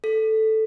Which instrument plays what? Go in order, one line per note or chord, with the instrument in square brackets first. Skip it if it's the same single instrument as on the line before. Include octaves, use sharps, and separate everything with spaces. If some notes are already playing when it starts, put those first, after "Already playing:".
[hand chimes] A4